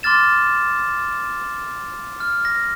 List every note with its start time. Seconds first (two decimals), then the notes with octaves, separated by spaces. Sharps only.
0.03 C6 D6 F6 A6 E7
2.20 F6
2.45 A#6